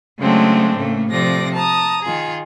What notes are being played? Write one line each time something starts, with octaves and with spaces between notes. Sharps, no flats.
C#3 F#3 G#3 A3 C4 D4
A2 C#3 A3 A#3
C3 F3 A3 D5 A#6
A5 A#5 D#6
D#3 F4 G#4